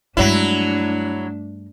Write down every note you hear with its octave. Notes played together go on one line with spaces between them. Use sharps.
G2 F#3 G#3 A3 D4 E4